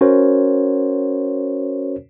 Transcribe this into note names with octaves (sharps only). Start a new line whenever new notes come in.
C#4 F#4 A#4 C5 C#5